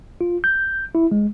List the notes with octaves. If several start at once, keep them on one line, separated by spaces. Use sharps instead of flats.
F4
G6
E4
G#3